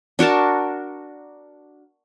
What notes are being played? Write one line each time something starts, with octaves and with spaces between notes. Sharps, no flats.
D4 F#4 A#4 A5